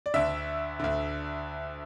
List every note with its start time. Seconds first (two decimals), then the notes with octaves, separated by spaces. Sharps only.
0.06 D5
0.14 D2 D3 E5
0.80 D2 D3